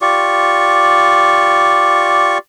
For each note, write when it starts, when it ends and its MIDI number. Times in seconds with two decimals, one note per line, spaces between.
0.02 2.38 65
0.02 2.38 67
0.02 2.38 74
0.02 2.38 85